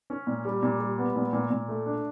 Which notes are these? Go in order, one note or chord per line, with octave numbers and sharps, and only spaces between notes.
C#4
A#2
G3
A#2
G3
B3
A#2
A#2
A#2
A3
D4